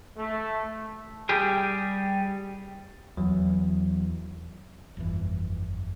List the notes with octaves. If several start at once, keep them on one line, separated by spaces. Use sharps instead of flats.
A3
G3 G4 G#4
E2 F#3
G1 F2 A#2 E3